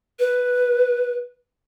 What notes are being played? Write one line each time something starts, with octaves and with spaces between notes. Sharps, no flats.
B4